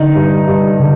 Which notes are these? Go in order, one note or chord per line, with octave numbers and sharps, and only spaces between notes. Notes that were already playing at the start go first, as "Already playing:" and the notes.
Already playing: D3 D#4
G2
G2
D3